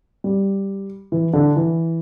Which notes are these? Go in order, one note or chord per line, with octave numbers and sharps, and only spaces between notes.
G3
E3
D3
E3